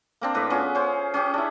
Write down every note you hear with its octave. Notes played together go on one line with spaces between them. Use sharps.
A#3 C4 D4
A2 B4
B3 C#4 F4 G#4
C#4 C5
C#4 G4 G#4
D4 E4